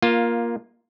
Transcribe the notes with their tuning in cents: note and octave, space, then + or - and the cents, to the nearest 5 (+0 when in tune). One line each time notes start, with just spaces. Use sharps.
A#3 +10 F4 +0